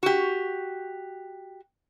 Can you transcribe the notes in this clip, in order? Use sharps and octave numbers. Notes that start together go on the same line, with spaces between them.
F#4 G4